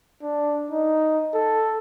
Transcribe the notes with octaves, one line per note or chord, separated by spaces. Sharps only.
D4
D#4
A4